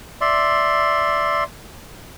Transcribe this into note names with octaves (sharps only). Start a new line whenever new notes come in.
D5 E5 C6